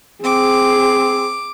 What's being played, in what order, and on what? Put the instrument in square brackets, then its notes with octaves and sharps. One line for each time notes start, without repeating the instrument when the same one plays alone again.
[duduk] C4 [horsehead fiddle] G#4 [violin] D6